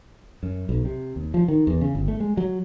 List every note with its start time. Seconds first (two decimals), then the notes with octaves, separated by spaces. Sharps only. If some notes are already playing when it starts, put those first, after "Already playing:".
0.43 F#2
0.69 B1
0.85 C3
1.16 D#2
1.34 F3
1.48 D#3
1.67 E2
1.81 C#3
1.95 G1
2.08 A3
2.20 G#3
2.37 F#3